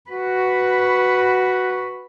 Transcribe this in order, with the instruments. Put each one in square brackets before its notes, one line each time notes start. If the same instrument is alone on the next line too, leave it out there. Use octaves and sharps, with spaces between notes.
[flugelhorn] F#4 [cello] B4